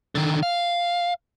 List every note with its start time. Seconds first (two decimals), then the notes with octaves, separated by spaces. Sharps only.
0.15 D3 D#3
0.43 F5